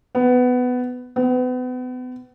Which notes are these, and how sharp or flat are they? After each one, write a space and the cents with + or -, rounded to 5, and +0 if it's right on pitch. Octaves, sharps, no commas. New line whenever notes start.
B3 +15
B3 +35